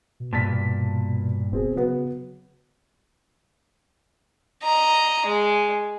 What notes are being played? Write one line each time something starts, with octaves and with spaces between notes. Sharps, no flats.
B2
G2 A#2 A5 A6 B6
E1 B2 C4 G#4
C#3 F#3 B3
D#5 A#5
G#3